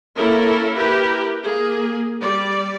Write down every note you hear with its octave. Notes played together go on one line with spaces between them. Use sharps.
A#3 C#4 E4 A4 A#4
E4 G4 A#4 B4
A#3 G#4
G3 D5